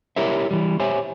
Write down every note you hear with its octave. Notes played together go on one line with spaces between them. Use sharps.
E4 G4 A#4 C#5 E5
E3 G3
G4 C5 C#5 E5 G#5